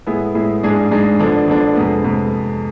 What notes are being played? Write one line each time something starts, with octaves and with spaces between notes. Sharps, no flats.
A2 G#3 B3 E4 G#4
A2 G#3 B3 E4 G#4
G#2 G#3 D4 G#4
G#2 G#3 D4 G#4
D3 F3 B3 D4
D3 F3 B3 D4
F2 C3 G#3 B3
F2 C3 G#3 B3